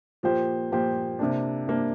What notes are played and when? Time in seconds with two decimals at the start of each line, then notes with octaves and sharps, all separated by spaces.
0.23 A#2 F3 A#3 G4 C5
0.71 A#2 F3 A#3 G4 C5
1.19 C3 A#3 D4
1.68 C3 A#3 D4